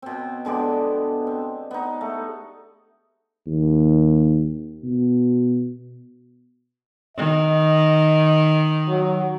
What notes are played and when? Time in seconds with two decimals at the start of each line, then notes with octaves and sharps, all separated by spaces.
0.02 B2 C4
0.45 D3 G#3 B3 G4
1.27 C4
1.71 B3 D#4
2.01 A3
3.47 D#2
4.84 B2
7.17 D#3 D#5
8.88 F#3